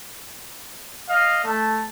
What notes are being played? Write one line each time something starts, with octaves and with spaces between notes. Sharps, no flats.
D#5 F5
A3 A5